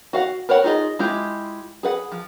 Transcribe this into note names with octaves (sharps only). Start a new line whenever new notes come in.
F#4 F5 F#5
A#4 B4 C#5 F#5
D#4 F4 G#4 B4 D#5
G#3 E4 F4 G4
G#4 B4 F#5
F3